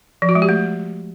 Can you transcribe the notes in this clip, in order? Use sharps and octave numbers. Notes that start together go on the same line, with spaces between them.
F3
F#4
G#3
G4
A3